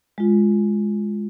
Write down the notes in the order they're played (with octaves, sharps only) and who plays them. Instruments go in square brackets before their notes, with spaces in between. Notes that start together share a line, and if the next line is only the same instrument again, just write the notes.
[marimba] G#3 F4